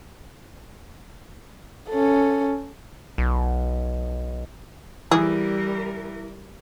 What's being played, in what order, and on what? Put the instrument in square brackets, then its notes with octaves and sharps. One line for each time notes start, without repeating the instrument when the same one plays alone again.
[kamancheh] C#4 A4
[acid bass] B1
[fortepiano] E3 [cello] G3 A#4 [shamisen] G#4